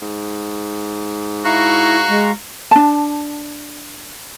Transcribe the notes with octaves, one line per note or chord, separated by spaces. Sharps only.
G#2
E4 F#4 F5 A#5 C#6
G#3
D4 A5